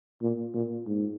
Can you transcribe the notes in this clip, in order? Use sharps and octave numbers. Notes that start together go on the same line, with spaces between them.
A#2
A#2
G#2